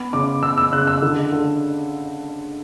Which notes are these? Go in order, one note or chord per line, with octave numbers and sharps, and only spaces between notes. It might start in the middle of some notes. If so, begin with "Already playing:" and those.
Already playing: B3
C#3 D6
B3 E6
E6
C#3 F#6
E6
D3
D3